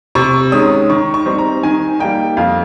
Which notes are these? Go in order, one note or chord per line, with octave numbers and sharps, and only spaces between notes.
C3 C#6
D#3 G#3 C#4 D#6
D#3 C#6
C#6
G3 C4 D#4
A#5
D#3 G#5
G3 A#3 D#4 G5
F2 F5